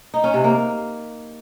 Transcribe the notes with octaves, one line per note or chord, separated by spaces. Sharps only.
D#4
C#4
C3
A#3